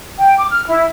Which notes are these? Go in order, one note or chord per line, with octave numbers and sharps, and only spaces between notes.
G5
D6
F6
E4